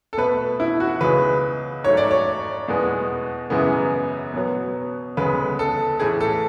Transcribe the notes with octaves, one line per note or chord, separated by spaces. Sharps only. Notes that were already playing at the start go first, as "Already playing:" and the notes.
A4
B2 A3 B4
E4
F#4
C#2 C#3 G#3 B3 B4
G#2 F#3 A3 C#5
D5
C#5
E2 B2 G#3 B3
F#2 C#3 E3 G#3 B3
B2 F#3 B3
D2 C#3 G#3 B3 B4
A4
A2 E3 A3 G#4
A4